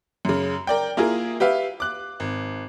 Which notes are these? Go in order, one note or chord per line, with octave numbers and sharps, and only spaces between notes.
F#2 C#3
A#4 D5 G5
A#3 E4 F4 G#4 A#4
G4 B4 E5 F5
D6 F#6
G#1